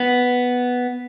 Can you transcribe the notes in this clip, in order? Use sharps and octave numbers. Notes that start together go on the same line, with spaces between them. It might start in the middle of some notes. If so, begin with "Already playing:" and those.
Already playing: B3